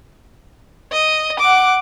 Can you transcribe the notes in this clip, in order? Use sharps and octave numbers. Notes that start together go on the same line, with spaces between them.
D#5
F#5 D6